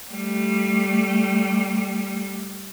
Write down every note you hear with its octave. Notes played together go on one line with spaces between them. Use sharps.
G3 A3